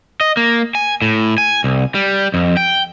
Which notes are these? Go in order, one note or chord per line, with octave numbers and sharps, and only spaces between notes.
D#5
A#3
G#5
A2
G#5
C2
G3
F2
G5